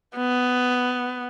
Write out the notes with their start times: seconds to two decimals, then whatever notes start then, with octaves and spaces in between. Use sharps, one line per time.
0.16 B3